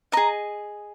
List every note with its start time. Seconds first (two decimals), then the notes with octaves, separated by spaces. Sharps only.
0.12 G#4 D#5 A#5